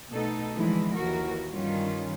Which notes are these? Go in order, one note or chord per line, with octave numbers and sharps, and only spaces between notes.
B2 A3 D#4 A4
D3 E3 F3 G#3 E4
D#2 E3 F#4 A#4
G2 D#3 G3 C#4 F4